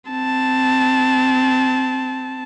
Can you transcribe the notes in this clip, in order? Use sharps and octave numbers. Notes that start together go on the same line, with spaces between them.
C4 A5